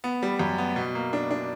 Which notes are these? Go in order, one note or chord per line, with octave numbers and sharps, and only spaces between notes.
B3
G3
F#2
B3
B2
A#3
D4
D4